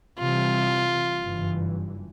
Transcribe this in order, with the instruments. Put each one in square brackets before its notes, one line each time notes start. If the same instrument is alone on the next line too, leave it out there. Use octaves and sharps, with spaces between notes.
[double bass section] C3 E3 G3 [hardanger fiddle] F4
[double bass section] F#1 G2 E3